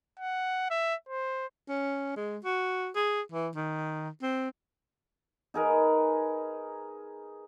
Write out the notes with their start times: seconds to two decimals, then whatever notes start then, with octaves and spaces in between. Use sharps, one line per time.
0.20 F#5
0.71 E5
1.09 C5
1.69 C#4
2.16 G#3
2.44 F#4
2.95 G#4
3.32 E3
3.55 D#3
4.22 C4
5.54 D#4 G#4 A#4 B4